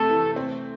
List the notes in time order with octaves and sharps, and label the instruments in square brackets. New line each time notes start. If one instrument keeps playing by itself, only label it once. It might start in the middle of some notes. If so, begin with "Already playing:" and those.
Already playing: [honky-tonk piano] C3 A3 [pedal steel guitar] A4
[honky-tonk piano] E3
C4